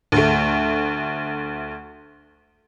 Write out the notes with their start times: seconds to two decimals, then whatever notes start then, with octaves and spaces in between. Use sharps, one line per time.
0.12 D2 A3